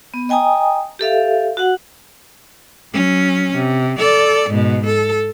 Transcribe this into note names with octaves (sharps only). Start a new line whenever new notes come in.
B3
D#5 G5 G#5 A#5 D#6
G4 A4 E5 F5
F#4 F#5
F#3 C#4
C3
A4 D5
G#2 B2
A4